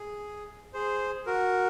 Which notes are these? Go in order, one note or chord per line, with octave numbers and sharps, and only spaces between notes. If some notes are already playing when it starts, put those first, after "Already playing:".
Already playing: G#4
G#4 C5
F#4 A#4